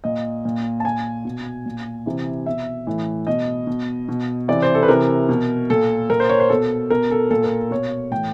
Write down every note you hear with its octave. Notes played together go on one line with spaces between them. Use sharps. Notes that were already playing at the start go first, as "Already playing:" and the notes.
A#2 D#5
A#2
A5
A#2 G#5
B2
A#2
C3 E3
B2 E5
A2 E3
B2 D#5
B2
B2
C3 E3 D5
C5
A4
B4
C3 E3 A#4
B2
A#2 A4
A#2 A#4
C5
C#5
C5
B2 A4
B2 A#4
A4
A#2 A4
A#4
B2 C#5
A2 E3 G5